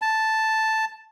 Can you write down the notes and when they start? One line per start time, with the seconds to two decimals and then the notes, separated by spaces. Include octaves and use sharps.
0.02 A5